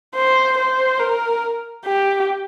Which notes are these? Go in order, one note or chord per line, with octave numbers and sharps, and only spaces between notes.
C5
C5
A#4
G4